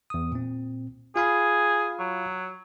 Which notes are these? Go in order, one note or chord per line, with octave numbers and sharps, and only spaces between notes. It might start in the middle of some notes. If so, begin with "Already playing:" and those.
E2 D#6
A#2 C4
F4 G#4 F5 B5
F#3